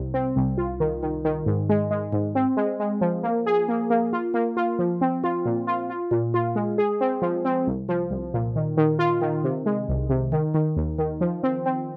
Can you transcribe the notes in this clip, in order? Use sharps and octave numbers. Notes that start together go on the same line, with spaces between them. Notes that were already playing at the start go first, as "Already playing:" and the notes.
Already playing: C2 C3
C4
C2
F4
D#3
D#3
D#3
G#2
G#3
G#3
G#2
C4
G#3
G#3
F3
A#3
G#4
A#3
A#3
F4
A#3
F4
F3
C4
F4
A#2
F4
F4
A#2
F4
G#3
G#4
C4
F3
C4
C2
F3
C2
A#2
D#3
D#3
F4
D#3
C3
G#3
C2
C3
D#3
D#3
D#2
D#3
F3
C4
C4